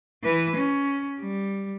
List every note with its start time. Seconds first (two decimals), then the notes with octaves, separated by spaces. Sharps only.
0.24 E3 B4
0.57 C#4
1.20 G3